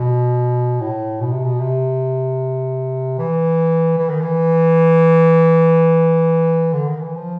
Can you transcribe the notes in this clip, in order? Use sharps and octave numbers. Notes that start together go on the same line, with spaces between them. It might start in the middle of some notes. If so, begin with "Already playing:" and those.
Already playing: B2
A2
B2
C3
B2
C3
E3
E3
D#3
E3
D3
D#3
E3
F3